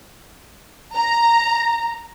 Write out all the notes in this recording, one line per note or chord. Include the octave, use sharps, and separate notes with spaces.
A#5